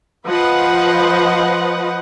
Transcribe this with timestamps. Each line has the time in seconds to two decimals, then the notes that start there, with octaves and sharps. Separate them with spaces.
0.25 F3 B4 C5 D#5 F#5